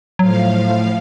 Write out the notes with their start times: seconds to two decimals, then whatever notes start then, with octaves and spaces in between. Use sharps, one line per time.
0.19 A2 F3 F#3 F5